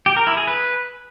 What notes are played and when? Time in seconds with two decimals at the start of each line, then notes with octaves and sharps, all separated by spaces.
0.06 G4
0.16 A#4
0.27 E4
0.37 G#4
0.47 B4